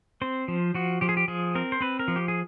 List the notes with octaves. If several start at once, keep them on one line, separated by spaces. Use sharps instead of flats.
C4 C5
F3
F3 F#4
F3 G4
G#4
G4
F3 G#4
C4 A#4
C5
C4 B4
A#4
F3
G4
G#4